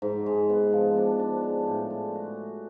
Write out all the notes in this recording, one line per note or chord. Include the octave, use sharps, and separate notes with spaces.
G#2
G#3
B3
F3
D4
D4
G#3
A2
G#3
F#4